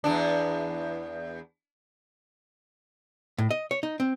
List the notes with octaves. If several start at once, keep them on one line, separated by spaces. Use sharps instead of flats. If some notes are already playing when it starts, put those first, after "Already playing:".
E2 B3 D4
A2
D#5
C#5
D#4
C4